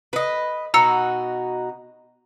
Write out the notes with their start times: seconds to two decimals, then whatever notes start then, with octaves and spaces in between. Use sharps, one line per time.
0.13 B4 D#5
0.74 B2 D#4 F#4 A#5 E6 C#7